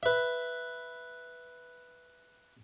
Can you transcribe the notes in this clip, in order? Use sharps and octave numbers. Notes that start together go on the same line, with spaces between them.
B4 E5